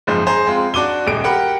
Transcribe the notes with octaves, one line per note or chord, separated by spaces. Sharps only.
F#1 G#2 F3 C5
G#4 C5 A#5
G#3 C4 F4
D4 F#4 D6 D#7 G7
D#1 C#2 D7
G4 A#4 F#5 B5